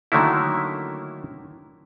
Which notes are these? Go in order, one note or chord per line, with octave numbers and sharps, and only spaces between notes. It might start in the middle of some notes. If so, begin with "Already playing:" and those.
D3 D#3 F#3 A3 A#3 E4